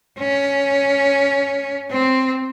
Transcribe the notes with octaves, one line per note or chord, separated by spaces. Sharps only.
C#4
C4